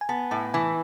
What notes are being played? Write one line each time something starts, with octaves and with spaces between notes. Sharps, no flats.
G#5
B3 A5
A2 A5
E3 G#5